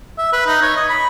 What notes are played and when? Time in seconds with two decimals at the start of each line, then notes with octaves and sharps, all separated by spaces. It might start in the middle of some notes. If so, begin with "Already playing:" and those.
0.18 E5
0.33 B4
0.47 D#4
0.62 C#5
0.76 D#5
0.89 B5